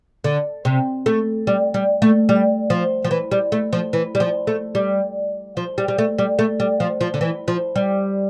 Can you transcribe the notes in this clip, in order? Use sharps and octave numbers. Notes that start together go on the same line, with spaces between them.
D3
C3
A3
G3
G3
A3
G3
F3
F3
E3
G3
A3
F3
E3
G3
F3
A3
G3
F3
G3
G3
A3
G3
A3
G3
F3
F3
D3
E3
F3
G3